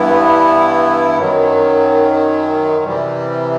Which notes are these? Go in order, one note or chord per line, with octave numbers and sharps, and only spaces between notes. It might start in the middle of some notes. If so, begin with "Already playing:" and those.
Already playing: G2 E3 B3 E4
F#2 D#3 F#3
C3 E3 G3